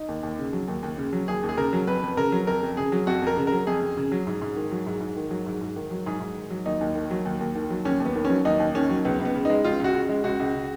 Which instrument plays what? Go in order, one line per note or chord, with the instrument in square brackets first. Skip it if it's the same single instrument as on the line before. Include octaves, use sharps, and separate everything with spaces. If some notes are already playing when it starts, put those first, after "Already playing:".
Already playing: [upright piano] D#4
D#2
D#2
C#3
F#3
D#2
D#2
C#3
F#3
D#2 G#4
D#2
G#4
C#3 A#4
F#3
F2 B4
F2
C#3 A#4
F#3
F2 A#4
F2
C#3 G#4
F#3
F2 F#4
F2 A#4
C#3
F#3 A#4
F2 G#4
F2
C#3
F#3
G#2
G#2
D#3
F#3
G#2
G#2
D#3
F#3
G#2
G#2
D#3
F#3
G#2 G#4
G#2
D#3
F#3
D#2 D#4
D#2
D#3
F#3
D#2
D#2
D#3
F#3
D#2 C#4
D#2
B3
D#3
C#4
F#3
D#2 D#4
D#2
D#3 C#4
F#3
C#2 B3
C#2
B3
C#3
G#3 D#4
C#2 F4
C#2 F#4
C#3
G#3
C#2 F#4
C#2
C#3